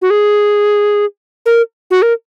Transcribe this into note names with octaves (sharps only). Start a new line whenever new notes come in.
F#4
G#4
A#4
F#4
A#4